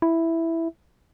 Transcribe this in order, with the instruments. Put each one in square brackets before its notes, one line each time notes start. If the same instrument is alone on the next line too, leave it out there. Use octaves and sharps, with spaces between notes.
[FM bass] E4